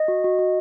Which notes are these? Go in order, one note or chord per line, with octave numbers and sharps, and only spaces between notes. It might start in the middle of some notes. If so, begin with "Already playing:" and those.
Already playing: D#5
F#4
F#4
F#4